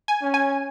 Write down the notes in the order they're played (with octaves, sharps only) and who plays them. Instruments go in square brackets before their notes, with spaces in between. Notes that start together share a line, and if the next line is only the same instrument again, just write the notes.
[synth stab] G#5
[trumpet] C#4
[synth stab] G#5